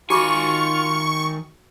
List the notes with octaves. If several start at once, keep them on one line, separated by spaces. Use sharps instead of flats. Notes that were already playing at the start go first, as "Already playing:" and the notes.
D#3 F4 F#4 G#5 B5 C#6 D6